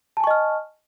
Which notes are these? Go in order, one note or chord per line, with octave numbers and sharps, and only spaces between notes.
D#5 G#5 A5 C#6 F6